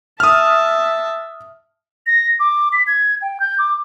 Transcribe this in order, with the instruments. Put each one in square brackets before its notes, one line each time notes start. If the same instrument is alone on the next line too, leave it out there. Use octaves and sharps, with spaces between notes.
[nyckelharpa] E5 A5 [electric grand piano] D#6 F6
[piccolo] A#6
D6
B6
G#6
G5
G6
D6